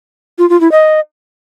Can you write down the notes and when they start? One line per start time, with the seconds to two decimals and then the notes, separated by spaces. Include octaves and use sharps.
0.39 F4
0.50 F4
0.61 E4
0.72 D#5